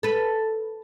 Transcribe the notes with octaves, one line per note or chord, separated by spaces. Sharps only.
A4 B4